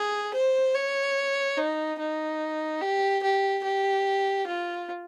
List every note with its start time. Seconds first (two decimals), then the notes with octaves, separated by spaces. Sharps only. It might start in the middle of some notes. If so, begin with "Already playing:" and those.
Already playing: G#4
0.34 C5
0.75 C#5
1.58 D#4
1.99 D#4
2.81 G4
3.23 G4
3.64 G4
4.47 F4